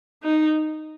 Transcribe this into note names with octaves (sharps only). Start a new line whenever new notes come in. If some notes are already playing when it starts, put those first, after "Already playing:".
D#4